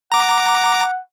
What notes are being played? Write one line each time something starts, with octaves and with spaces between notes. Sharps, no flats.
F#5 A#5 D6